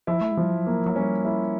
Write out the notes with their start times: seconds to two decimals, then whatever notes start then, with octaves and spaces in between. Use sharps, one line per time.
0.07 F3 E4
0.21 A3
0.31 G#3
0.37 F3 G3
0.52 F#3
0.67 A#3
0.86 F#3
0.95 G3 C#4
1.25 E4